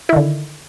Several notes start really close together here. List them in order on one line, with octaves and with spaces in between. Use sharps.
E4 D#3 D3